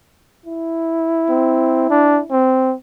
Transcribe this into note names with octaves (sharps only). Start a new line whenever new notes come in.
E4
C4
D4
C4